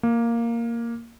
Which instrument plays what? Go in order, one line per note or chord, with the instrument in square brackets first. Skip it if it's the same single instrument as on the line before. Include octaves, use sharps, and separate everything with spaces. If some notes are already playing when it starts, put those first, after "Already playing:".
[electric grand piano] A#3